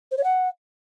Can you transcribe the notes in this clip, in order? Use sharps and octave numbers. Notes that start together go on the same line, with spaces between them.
C5
C#5
F#5